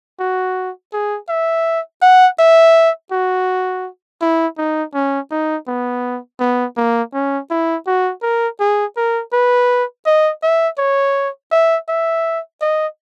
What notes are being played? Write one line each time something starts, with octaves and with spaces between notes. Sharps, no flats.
F#4
G#4
E5
F#5
E5
F#4
E4
D#4
C#4
D#4
B3
B3
A#3
C#4
E4
F#4
A#4
G#4
A#4
B4
D#5
E5
C#5
E5
E5
D#5